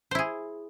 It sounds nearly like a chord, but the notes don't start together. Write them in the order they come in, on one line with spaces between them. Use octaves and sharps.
C5 E4 G#4